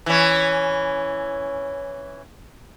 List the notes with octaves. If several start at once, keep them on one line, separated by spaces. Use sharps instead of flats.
E3 C#4